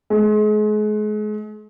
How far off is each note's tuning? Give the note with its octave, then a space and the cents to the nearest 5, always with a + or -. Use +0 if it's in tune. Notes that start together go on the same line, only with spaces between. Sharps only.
G#3 +35